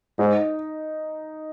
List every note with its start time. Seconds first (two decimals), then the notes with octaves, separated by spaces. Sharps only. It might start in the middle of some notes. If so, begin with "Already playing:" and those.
0.19 G#2 D#4